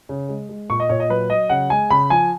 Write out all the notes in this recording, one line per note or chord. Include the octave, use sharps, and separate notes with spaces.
C#3
G#3
G#3
A#2 C#6
D#5
A#2 C#5
D#5
F#3 B4
F#3 D#5
C#3 F#5
G#3 G#5
C#3 B5
F3 G#5